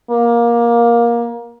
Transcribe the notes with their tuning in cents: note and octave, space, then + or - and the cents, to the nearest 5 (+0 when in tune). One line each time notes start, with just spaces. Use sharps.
A#3 +15